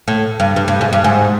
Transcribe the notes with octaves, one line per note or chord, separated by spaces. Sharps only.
A2
G2
G2
G2
G#2
G2
G#2